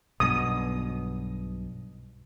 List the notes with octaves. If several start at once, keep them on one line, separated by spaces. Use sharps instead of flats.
B1 G2 B2 D#6